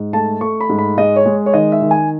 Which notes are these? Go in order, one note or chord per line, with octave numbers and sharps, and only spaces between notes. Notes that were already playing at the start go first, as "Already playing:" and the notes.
Already playing: G#2
A3 A5
A3 C#6
B5
G#2
B5
G#3 D#5
C#5
G#3
C#5
D#3 D#5
E5
D#3
G#5